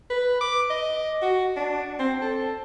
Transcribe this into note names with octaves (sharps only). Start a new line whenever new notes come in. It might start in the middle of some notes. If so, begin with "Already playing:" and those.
B4
D6
D#5
F#4
D4
C4
A4